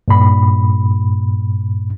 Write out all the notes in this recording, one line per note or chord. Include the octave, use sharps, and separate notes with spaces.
G2 A#2 B5